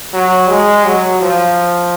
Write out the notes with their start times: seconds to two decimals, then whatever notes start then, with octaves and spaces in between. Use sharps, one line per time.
0.14 F#3
0.49 G#3
0.85 F#3
1.21 F3